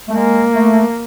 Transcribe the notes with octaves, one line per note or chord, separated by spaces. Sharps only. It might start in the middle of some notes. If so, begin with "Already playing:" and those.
A3
G#3 A#3
A3